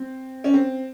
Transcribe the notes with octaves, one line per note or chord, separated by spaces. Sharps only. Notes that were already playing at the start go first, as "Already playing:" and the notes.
Already playing: C4
C#4
C4